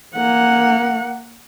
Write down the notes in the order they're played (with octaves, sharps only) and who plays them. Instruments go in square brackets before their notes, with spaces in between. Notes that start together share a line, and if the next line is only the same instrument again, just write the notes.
[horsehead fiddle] A#3 F#5